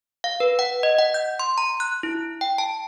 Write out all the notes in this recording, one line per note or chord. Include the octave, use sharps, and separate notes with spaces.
F5
B4
F#5
D#5
F#5
G6
C6
A#5
F#6
E4
G5
A5